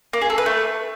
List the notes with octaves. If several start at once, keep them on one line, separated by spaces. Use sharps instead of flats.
A#3
G#4
A4
B4
A3